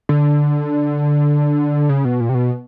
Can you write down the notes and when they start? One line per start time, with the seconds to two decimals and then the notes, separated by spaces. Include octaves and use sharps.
0.09 D3
1.89 C#3
2.05 B2
2.20 A#2
2.29 C3
2.35 B2